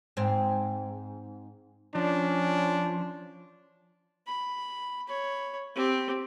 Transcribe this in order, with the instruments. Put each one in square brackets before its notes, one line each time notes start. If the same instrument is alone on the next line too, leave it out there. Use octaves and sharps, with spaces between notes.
[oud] G#2 C4
[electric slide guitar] F3 [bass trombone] C#4 [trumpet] D4
[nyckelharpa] B5
C#5 B5
C4 G4